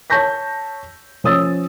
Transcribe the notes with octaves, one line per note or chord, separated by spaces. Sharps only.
C#5 A5 C#6 G6 A#6 B6
F3 C#4 C#5 D#6 E6 A6